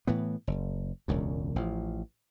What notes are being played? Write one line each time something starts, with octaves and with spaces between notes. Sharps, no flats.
A2 E3 B3
F#1
E1 C#2 F#2
A1 F3